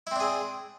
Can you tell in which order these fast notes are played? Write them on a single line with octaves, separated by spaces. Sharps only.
E4 C4 D4 G#4